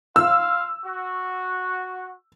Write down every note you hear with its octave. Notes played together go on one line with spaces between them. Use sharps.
F4 F5 E6
F#4